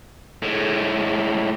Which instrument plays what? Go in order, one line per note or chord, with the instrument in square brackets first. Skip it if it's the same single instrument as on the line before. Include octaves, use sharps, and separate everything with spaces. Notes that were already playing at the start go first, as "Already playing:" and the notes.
[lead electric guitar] A2 G#3